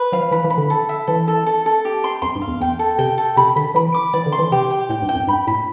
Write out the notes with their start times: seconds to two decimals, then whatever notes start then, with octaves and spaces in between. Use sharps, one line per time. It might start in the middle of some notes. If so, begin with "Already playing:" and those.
Already playing: B4
0.12 F3 F5
0.31 E3 B5
0.44 E3
0.50 B5
0.58 D3
0.70 A4
0.89 E5
1.07 E3 A4
1.28 A4
1.46 A4
1.66 A4
1.85 G4
2.04 C6
2.22 F2 C6
2.36 G2
2.42 F5
2.48 E2
2.61 E2 G5
2.79 A4
2.99 C3 G5
3.18 A4
3.37 C3 B5
3.56 D3 B5
3.75 E3 B5
3.94 D6
4.13 E3 D5
4.26 D3
4.32 C6
4.39 E3
4.52 C3 G4
4.71 G5
4.90 A2 G5
5.02 G2
5.09 G5
5.15 F2
5.28 G2 B5
5.47 A2 B5